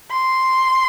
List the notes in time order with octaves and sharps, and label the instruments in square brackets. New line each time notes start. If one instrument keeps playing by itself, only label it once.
[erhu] C6